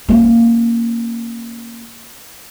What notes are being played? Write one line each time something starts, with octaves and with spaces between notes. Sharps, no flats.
A#3 C#4